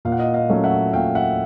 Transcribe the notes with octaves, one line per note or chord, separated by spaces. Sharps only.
A#2 F5
F#5
D#5 F5
D#5 F5
F#3 A3 C#4
E5 F#5
A#2 F5 G5
E5 F#5